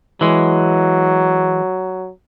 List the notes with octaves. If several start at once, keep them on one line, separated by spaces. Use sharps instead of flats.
E3 F#3 G#3